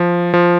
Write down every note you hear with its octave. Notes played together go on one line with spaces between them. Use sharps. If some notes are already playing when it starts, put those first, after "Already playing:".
Already playing: F3
F3